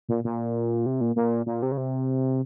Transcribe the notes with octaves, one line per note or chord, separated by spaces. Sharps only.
A#2
A#2
C3
A#2
A#2
A#2
C3
C#3
C3